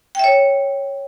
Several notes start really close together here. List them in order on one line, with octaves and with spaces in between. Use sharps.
G5 E5 C#5